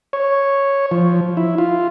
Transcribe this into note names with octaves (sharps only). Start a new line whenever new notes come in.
C#5
F3
E4
F4